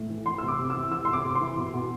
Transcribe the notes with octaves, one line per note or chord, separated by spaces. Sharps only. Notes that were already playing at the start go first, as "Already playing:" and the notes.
Already playing: A2
E3
E3 C6
C3 E6
D6
C3
E6
E3
E3 E6
C3 C6
D6
C3
C6
E3
B2
B2